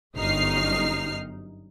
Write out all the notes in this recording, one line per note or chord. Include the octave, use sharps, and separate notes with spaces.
G1 F#2 D#4 F6 C7